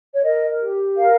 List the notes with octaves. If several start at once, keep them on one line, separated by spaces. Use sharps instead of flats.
C#5
A#4 D#5
G4
A#4 F5